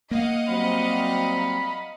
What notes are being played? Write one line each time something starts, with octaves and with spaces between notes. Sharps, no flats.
A#3 D#5 F5 F#5
F#3 G3 C4 B5